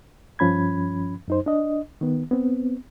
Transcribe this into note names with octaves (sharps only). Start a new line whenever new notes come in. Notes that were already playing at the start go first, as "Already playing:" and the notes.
G2 F3 C#4 B5 G#6
F#2 D#4 C5
D4 D#5
D#3 B3
B3 C4